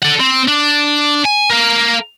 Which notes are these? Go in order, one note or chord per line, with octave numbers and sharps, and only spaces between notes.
A4 F#5
C4
D4
G#5
A#4 F5